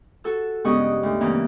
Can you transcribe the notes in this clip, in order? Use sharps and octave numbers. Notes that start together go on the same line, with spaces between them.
F#4 A4 E6
G2 C#3 G#3 B3 D#5 C#6
D2
C#3 E3 A#3 C4